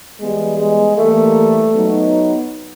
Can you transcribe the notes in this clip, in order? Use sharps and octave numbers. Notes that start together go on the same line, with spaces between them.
E3 G3 G#3 B3
G#3
E3 G3 A3 A#3
F#3 B3 D#4